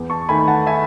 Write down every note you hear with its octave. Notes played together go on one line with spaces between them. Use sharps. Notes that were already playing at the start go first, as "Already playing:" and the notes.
Already playing: E2
A5 C#6
D#3 A3 G#5 B5
F#5 A5
E5 G#5